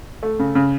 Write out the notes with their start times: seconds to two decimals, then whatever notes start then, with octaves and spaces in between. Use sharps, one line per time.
0.23 A3
0.39 C#3
0.55 C#3